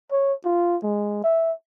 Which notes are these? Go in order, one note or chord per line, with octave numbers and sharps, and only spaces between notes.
C#5
F4
G#3
E5